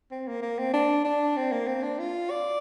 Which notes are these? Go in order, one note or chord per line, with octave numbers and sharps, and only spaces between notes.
C4
A#3
A#3
C4
D4
D4
C4
A#3
C4
D4
F4
D5